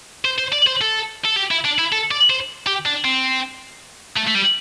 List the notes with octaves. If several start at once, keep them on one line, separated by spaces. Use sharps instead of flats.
C5
C5
D5
C5
A4
A4
G4
E4
D4
E4
A4
D5
C5
G4
D4
C4
A3
A3
G3